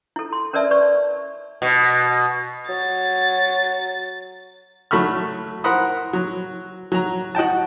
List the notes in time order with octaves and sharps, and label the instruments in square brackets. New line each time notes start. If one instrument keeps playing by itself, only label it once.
[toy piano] E4 A4
C6
C#4 A#4 B4 D5 E5 A5
B4 D5 C#6
[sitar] B2
[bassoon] F#3 [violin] A6
[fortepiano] F#3 A3 B5 C#6 F6
A#4 C5 F#5 B5 D#6
F#3
F#3 A#5
F#4 D#5 G5 A5